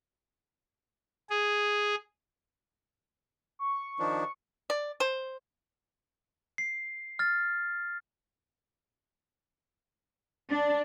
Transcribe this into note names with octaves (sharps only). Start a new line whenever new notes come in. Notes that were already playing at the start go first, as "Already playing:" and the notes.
G#4
C#6
D#3 F3 D4
D5
C5
C7
F6 A6
D4